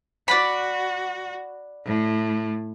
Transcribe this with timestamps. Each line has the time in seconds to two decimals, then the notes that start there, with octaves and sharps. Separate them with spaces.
0.28 F#4 D5 F#5 B5
1.85 A2